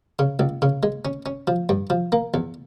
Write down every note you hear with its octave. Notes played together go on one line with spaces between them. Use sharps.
C#3
C#2
C#3
G#3
C#4
C#4
F3
G2
F3
A#3
E2